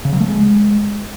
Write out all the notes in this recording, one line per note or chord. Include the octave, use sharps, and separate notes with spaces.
C#3
F#3
A3
G#3